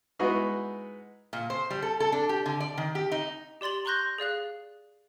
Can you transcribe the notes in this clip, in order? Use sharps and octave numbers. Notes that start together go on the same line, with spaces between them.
G#3 B3 D#4 E4 F#4 G#4
A#2
C5
G3
A4
A4
D4
G4
D3
D5
D#3
G4
D#4
G4 D5 C6 A6 F#7
A#5 C6 C#6 F#6 G6 A#6
G#4 D5 F5 F#6